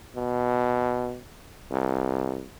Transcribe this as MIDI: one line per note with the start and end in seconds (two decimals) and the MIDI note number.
0.16 1.18 47
1.71 2.44 36